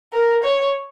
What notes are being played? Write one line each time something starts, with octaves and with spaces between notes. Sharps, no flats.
A#4
C#5